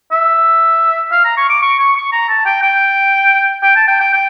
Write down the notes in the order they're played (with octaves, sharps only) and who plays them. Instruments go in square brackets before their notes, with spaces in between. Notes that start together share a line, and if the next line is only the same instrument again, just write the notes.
[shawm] E5
F5
A#5
C#6
D6
C#6
C#6
C#6
A#5
A5
G5
G5
G5
A5
G5
G5
G5